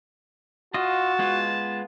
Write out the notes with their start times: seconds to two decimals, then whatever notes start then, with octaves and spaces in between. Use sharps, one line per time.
0.74 F4 F#4 D#5 A5
1.19 G#3 B3 F4